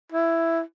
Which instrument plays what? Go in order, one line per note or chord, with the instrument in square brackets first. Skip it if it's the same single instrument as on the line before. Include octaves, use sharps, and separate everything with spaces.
[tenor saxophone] E4